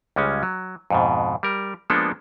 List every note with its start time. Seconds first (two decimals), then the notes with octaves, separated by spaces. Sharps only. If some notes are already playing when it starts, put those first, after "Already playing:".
0.16 C#2 G3 G#3 C#4
0.43 F#3
0.90 F2 G#2 B2
1.43 G3 A#4
1.90 F3 G#3 A#3 B3 D4 A4